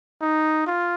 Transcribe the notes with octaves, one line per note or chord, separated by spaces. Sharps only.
D#4
F4